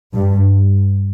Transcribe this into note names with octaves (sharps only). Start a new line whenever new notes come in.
G2